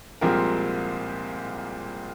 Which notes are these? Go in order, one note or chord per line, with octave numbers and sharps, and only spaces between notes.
C2 A#2 F3 G#3 C4 G4 A#4